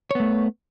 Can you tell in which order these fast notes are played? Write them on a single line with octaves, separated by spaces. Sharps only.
C#5 B3 A3